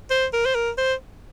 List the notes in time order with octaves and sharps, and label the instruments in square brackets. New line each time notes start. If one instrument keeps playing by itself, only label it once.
[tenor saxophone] C5
A#4
C5
A#4
C5